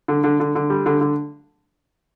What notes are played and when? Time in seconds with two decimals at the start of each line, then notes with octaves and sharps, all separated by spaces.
0.08 D3
0.24 D3
0.40 D3
0.55 D3
0.70 G3
0.86 D3
1.01 D3